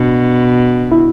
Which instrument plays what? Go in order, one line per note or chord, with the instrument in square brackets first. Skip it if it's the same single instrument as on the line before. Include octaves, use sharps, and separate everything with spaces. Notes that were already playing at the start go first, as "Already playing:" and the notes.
Already playing: [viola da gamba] B2 [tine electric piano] D4
[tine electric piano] E4